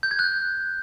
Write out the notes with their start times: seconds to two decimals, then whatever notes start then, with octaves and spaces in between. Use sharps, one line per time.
0.03 G6
0.11 G#6
0.19 F#6